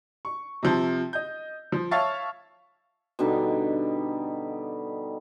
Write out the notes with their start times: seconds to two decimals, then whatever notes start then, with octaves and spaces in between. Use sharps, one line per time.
0.25 C#6
0.63 C3 F3 A5
1.13 D#5 G6
1.72 F3
1.91 C#5 E5 F5 A5 C#6 A6
3.19 B2 D3 G3 D#4